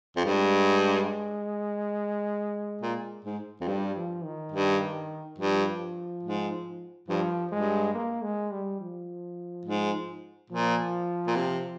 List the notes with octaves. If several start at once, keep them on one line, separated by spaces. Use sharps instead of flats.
F2
G2 G#3
A#2
G#2
F2
G2 G3
F3
D#3
G2
G2 F3
G#2
G2 F3
G2 G#3
A#3
G#3
G3
F3
G#2
A#2 F3
A#2
C3